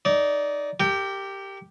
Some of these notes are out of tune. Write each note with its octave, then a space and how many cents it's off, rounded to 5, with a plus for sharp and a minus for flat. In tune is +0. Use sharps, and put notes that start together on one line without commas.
D#4 +0 D5 -20
G4 +0 A#4 -35 G5 +0